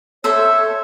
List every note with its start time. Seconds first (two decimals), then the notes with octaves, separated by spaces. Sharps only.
0.24 A4 C5 C#5 E5